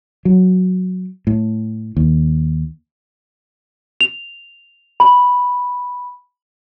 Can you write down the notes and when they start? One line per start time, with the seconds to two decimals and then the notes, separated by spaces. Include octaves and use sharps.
0.25 F#3
1.27 A2
1.97 D#2
4.01 F7
5.00 B5